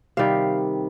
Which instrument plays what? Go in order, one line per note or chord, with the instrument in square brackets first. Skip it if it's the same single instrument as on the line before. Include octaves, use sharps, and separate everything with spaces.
[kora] C3 D#3 G3 F5